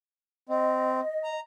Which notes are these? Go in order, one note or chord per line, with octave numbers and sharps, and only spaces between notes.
C4 D#5
A#5